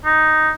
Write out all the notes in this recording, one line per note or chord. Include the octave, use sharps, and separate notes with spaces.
D#4